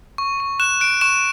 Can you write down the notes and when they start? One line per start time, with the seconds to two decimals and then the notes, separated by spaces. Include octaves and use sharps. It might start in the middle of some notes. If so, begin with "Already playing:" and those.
0.18 C#6
0.40 C#6
0.60 F#6 E7
0.80 F#6 D7
1.01 C#6 E7